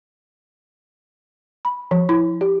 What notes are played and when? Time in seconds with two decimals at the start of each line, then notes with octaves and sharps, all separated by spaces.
1.65 B5
1.91 F3
2.09 E4
2.41 G4